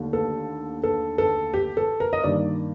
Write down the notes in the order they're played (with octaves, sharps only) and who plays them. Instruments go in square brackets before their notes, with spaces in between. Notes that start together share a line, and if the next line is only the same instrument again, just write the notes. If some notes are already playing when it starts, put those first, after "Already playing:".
Already playing: [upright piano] D#2 D3 A3
A4
A4
A4
G4
A4
A#4
D#5
G2 D#3 A#3 D5